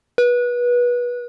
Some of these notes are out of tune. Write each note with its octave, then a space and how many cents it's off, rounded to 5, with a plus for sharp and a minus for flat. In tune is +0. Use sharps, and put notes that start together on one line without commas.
B4 -25